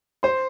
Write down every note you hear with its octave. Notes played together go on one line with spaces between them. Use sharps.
C5 C6